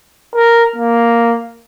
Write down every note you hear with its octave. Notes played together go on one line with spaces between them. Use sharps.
A#4
A#3